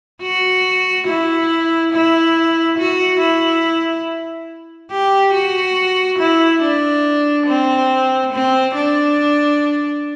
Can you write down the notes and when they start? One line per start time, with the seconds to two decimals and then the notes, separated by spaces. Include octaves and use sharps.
0.22 F#4
1.07 E4
1.92 E4
2.78 F#4
3.20 E4
4.91 G4
5.33 F#4
6.19 E4
6.62 D4
7.47 C4
8.32 C4
8.75 D4